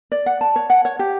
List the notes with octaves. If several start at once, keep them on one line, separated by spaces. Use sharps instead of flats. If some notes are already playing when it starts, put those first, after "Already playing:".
D5
F#5
A5
C#5
F#5
C#5
G4